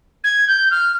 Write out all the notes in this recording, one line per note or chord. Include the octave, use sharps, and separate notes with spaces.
G#6
G6
F6